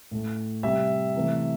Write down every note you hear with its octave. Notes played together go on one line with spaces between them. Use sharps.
A2 A3
C3 G3 E5
C3 E3 A3